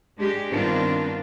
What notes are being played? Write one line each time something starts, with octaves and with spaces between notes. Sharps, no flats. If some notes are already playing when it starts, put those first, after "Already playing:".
G#3 D4 G4
G2 D#3 B3 C4 D4 F4